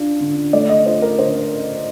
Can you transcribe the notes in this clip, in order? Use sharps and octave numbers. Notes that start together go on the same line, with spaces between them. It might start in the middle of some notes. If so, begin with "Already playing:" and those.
Already playing: D4 F4
D3
A3 D5
D#5
F4 C5
A#4
D3 C5